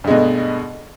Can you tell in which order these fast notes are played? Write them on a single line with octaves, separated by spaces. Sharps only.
G2 G#3 B2 A3